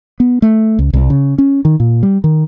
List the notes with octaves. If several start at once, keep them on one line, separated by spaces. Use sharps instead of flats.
B3
A3
C#2
C2
C#3
C#4
D#3
A#2
G3
D#3